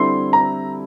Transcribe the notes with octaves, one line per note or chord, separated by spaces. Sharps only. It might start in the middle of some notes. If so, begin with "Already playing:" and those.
Already playing: D3 G3 C4 E4 A4 C6
A#5